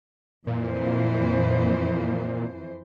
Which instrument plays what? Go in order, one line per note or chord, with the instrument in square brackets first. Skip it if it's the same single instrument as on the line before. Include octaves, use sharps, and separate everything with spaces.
[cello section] F2 E3 C5 [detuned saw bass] A#2